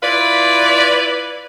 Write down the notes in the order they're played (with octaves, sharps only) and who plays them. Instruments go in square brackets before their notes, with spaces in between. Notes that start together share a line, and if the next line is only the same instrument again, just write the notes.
[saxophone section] E4 F4 B4 D5